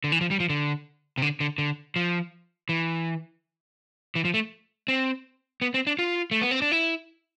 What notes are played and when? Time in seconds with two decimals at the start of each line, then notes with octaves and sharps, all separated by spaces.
0.04 D3
0.12 E3
0.21 F3
0.31 G3
0.40 F3
0.49 D3
1.18 C3
1.22 D3
1.40 D3
1.58 D3
1.96 F3
2.69 E3
4.15 E3
4.25 F3
4.34 A3
4.88 C4
5.62 B3
5.74 C4
5.87 D4
5.99 F4
6.31 A3
6.41 B3
6.51 C4
6.62 D4
6.72 E4